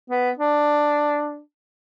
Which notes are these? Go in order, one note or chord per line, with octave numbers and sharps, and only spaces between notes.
B3
D4